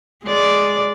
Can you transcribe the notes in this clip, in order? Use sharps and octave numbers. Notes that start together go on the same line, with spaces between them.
G#3 D5